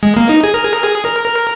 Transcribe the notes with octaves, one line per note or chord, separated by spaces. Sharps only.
G#3
A#3
D#4
G#4
A#4
G#4
A#4
G#4
A#4
A#4